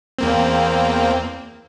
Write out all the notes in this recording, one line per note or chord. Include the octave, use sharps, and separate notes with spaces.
E2 A#3 C4